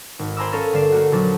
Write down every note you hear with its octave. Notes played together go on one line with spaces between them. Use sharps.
G#1
C5 G#5 A#5 B5 D6 E6
C#4 A4 A#4 C#5 F5
G1 D3 D5 F5 C7 E7
A3 A#3 F#4
A#1 F#3 D4